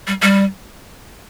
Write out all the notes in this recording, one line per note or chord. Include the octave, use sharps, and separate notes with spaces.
G3
G3